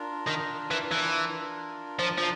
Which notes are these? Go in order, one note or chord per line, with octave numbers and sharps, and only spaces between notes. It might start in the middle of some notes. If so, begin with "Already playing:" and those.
Already playing: D4 F4 A#4
D#3
E3
E3
F3
F3